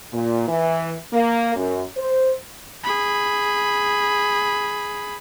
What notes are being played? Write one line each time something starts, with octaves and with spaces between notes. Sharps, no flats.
A#2
E3
A#3
F#2
C5
G#4 B5